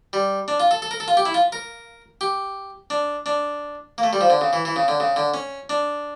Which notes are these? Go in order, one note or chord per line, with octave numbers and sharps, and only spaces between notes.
G3
D4
F4
A4
A4
A#4
A4
F4
G4
E4
F4
A#4
G4
D4
D4
A#3
A3
G3
F3
D3
C#3
E3
E3
C#3
D3
C#3
D3
C#4
D4